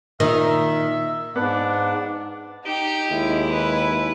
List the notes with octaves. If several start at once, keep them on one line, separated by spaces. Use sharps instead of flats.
A#2 D#3 D#4 E5 D#6
G#2 B3 D4 F#5 D6
D#4 G4
D#2 G#3 E4
B4